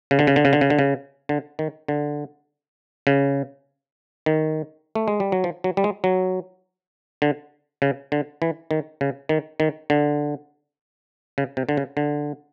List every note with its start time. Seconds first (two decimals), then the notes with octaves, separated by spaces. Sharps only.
0.11 C#3
0.19 D3
0.27 C#3
0.36 D3
0.45 C#3
0.53 D3
0.61 C#3
0.70 D3
0.79 C#3
1.29 D3
1.59 D#3
1.88 D3
3.07 C#3
4.26 D#3
4.95 A3
5.08 G#3
5.20 G3
5.32 F#3
5.44 F3
5.64 F#3
5.77 G3
5.84 G#3
6.04 F#3
7.22 D3
7.82 C#3
8.12 D3
8.42 E3
8.71 D#3
9.01 C#3
9.29 D#3
9.60 D#3
9.90 D3
11.38 C#3
11.57 C3
11.69 D3
11.77 C#3
11.97 D3